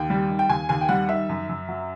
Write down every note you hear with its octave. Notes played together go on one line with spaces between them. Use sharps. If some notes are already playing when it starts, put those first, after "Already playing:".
Already playing: D#2 G5
G3
D#3
G5
D#2 G#5
D#2 G#5
G5
G3 F#5
D#3 E5
F#2
F#2
F#3